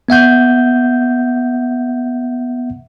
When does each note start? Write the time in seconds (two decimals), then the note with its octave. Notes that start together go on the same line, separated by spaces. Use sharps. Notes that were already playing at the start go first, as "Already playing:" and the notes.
0.09 B3 E5 F#5 G6